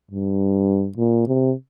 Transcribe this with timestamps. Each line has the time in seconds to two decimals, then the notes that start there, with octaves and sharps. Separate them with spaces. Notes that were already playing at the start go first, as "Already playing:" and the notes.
0.11 G2
0.98 A#2
1.27 C3